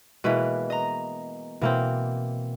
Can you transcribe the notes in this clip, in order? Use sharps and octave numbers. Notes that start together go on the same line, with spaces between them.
B2 E3 G#3 A#3 B4
D#5 A#5
B2 E3 A#3 C4